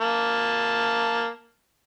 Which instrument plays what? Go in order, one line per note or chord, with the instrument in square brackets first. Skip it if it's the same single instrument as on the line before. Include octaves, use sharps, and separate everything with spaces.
[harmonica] A#3 A5